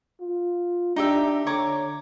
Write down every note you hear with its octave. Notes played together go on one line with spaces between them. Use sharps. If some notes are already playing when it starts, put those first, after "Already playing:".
F4
D4 D#4 G4 E5
D3 C#5 A#5 D6